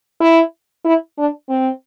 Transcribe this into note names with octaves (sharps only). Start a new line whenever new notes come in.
E4
E4
D4
C4